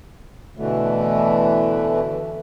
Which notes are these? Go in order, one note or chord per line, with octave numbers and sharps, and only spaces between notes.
B2 D3 E3 A3